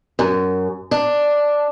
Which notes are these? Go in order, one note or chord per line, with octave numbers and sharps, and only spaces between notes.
F#2
D4